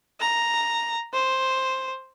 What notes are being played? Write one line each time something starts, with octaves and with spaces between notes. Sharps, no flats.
A#5
C5